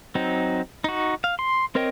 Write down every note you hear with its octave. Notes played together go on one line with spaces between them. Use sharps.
F#3 C4 D#4
D#4 F#4
F5
C6
C4 A#4 C#5 D#5 G5